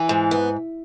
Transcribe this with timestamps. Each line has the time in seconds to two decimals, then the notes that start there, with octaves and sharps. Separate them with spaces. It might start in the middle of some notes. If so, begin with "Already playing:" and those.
Already playing: E3
0.09 G#2
0.31 B3